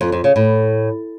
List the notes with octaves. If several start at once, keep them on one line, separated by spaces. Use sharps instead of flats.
F2
F2
C#3
A2